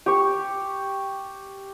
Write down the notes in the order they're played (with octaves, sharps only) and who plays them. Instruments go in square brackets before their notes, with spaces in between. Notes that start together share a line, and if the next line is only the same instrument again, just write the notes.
[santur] G4 C#6